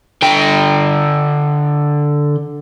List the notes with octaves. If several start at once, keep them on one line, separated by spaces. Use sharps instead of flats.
D3 G5